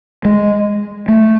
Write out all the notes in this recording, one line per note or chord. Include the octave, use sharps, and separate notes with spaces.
G#3
A3